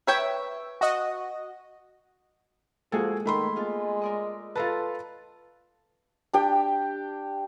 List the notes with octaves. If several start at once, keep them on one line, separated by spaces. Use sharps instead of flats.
B4 C#5 E5 G5
F#4 D#5
F3 G#3 A#3 F#4 G#4 A4 G#5
D#3 A3 B5 C6
G#3 B3 F4
A#4 D5 D#5
F4 A4 B4 A5 A#5 C6
D4 G4 G5